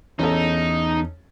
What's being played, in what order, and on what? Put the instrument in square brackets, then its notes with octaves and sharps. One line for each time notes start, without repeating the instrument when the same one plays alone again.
[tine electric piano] E2 [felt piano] C#4 A4 [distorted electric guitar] D#4